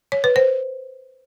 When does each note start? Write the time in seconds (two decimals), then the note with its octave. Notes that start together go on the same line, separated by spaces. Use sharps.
0.12 C#5
0.24 B4
0.36 C5